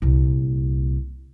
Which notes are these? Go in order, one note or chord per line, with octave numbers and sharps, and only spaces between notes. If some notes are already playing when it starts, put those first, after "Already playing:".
C2 A#2